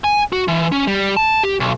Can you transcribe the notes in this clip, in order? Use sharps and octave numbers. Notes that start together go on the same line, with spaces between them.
G#5
F#4
E3
C#4
G3
A5
G4
B1